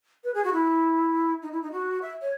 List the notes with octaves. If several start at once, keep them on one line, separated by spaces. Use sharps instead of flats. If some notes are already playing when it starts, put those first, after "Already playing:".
B4
G#4
F#4
E4
D#4
E4
D#4
F#4
E5
C#5